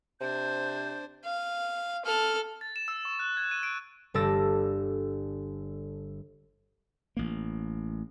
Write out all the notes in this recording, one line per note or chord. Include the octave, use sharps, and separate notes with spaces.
C3 D4 C5 G6
F5
A4 F6
A6
E7
E6
C#6
F#6
G#6
D#7
D7
G1 G3 A4 D5 E6 A#6
A1 A#3